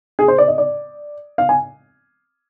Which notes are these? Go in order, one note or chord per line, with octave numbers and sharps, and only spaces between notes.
G#4
C5
D5
D#5
D5
F5
G#5